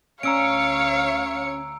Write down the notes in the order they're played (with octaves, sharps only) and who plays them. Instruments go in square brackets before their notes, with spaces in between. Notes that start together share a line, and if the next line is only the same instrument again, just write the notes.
[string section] D2 C#5 C#7 [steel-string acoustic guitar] C#4 [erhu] F5 [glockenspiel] A#5 E6 D7